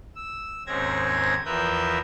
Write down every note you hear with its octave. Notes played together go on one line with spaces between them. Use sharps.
E6
D#2 G#2 C4 C#4 G#6 A#6
E2 F3 A#4 B4 E5 G6